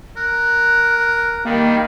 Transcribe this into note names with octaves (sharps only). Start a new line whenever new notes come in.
A#4 F#6
D#3 G3 A#3